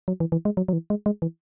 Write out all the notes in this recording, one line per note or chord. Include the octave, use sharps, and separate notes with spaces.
F#3
E3
E3
G#3
F#3
F#3
E3
G#3
G#3
E3